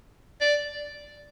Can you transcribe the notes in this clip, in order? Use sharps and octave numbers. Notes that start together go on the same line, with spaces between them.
D5